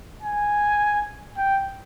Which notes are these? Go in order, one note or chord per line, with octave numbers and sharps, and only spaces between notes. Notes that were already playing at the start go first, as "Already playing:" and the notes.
G#5
G5